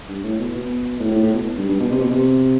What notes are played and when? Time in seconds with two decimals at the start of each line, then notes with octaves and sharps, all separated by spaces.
0.09 G2
0.24 A2
0.40 B2
0.55 B2
1.00 A2
1.11 A2
1.22 A2
1.34 B2
1.57 G2
1.69 G2
1.80 B2
1.91 C3
2.01 B2
2.11 C3